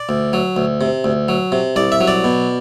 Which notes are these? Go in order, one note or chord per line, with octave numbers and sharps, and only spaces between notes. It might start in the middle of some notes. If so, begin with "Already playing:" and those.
Already playing: D5
D2
F#3
D2
C3
D2
F#3
C3
C2 D5
E5
F#3
D5
B2